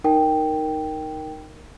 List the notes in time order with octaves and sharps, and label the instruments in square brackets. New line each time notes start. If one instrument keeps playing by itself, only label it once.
[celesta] D#4 A#4 G5